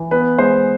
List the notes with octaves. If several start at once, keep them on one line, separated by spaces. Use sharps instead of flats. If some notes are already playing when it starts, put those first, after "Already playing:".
Already playing: E3
B3 B4
G#3 C5